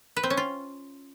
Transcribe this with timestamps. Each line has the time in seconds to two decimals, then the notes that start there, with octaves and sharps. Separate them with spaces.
0.16 B4
0.23 C4
0.30 C#4
0.37 F4